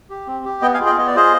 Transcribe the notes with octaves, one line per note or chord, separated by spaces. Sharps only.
G4
C4
G4
B3 D#5 G5
F5 G#5
F4 G#4
D#5 G5
B3 D#5
D5
F4 G#4 C5 D#5